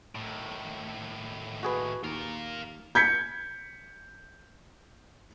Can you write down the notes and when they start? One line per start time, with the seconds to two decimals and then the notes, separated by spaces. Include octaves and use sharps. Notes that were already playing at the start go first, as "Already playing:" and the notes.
0.15 D#2 A2
1.63 F#4 G#4 B4
2.04 D#2 F4 A#4
2.95 G6 G#6 B6 C#7